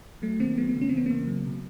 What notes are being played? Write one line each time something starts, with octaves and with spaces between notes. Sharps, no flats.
F#3 A3
D#3 A#3 C4
F#3 A3 B3
A3 B3
C#3
C#4
C4
E3 B3
C#3 A#3 C4
F#3
B2